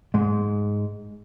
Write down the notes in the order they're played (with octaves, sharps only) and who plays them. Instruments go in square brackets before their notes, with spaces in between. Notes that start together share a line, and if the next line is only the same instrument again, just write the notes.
[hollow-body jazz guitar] G#2 G#3